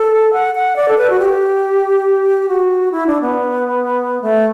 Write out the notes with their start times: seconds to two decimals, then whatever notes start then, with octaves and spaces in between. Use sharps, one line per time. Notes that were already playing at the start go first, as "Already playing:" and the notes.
Already playing: A4
0.33 F#5
0.55 F#5
0.76 D5
0.88 A4
0.98 B4
1.10 F#4
1.19 G4
2.49 F#4
2.92 E4
3.07 D4
3.21 B3
4.22 A3